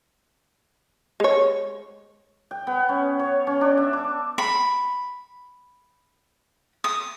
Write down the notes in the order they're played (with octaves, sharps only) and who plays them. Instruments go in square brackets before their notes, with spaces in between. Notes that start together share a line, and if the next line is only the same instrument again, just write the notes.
[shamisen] G#3 C#5
[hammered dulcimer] G5
B3
C#4
C#5
C#4
D4
E5
D6
[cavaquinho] B5
D#6